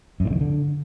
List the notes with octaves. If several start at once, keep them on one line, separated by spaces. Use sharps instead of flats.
F#2
A2
C#3
D#3
D3